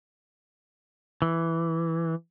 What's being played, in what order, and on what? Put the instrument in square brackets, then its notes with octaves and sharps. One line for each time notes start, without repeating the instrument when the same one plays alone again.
[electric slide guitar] E3